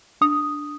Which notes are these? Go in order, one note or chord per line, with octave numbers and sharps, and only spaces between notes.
D4 D#6